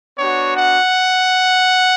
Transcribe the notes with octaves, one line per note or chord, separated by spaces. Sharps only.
B3 D4 F#4 C#5
F#5